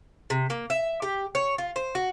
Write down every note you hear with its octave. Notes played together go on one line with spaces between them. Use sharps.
C3
A#3
E5
G4
C#5
F4
C5
F#4